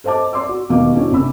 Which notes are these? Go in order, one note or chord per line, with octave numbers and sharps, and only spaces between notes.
A4 C5 D#5 A5 D6
D5 C6 D6 E6
F#4
E1 D#2 B2 F5 D6
C#4 D4 E4 F#4
F#1 C3 D4 B5 E6